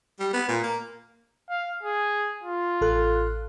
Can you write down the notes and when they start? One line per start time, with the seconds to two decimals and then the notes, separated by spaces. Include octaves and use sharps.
0.20 G3
0.33 B3
0.48 A#2
0.64 A#3
1.50 F5
1.83 G#4
2.44 F4
2.81 A1 A4 F#6